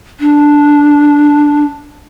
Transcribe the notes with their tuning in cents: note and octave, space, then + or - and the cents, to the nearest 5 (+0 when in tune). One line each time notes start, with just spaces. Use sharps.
D4 -5